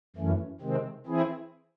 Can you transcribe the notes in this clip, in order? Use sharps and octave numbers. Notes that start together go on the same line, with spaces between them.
F#2 E3 A3 C#4
C3 D#3 G#3 C4
E3 C4 E4 G#4